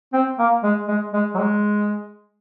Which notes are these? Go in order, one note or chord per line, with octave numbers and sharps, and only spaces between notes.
C4
A#3
G#3
G#3
G#3
F#3
G#3